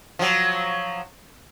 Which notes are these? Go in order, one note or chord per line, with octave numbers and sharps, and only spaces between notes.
F3 F#3